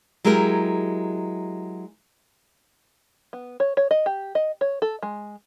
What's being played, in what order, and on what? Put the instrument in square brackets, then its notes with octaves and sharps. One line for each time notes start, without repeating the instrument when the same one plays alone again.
[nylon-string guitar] F#3 G#3 E4 G4 A#4
[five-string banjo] B3
C#5
C#5
D#5
G4
D#5
C#5
A4
G#3